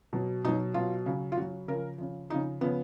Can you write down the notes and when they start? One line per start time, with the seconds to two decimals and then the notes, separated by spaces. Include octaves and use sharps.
0.13 B2 F#3
0.44 B2 F#3 D#4
0.74 B2 F#3 F4
1.06 C#3 F#3
1.32 F4
1.37 C#3 F#4
1.42 F#3
1.68 C#3 F3 A#4
1.98 C#3 F3
2.30 C#3 F3 D#4
2.61 C#3 F3 B3